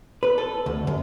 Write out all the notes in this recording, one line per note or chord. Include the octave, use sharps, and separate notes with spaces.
B4
A4
D2
F#2